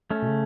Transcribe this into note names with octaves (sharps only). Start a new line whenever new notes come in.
A3 C#4
B2
C#3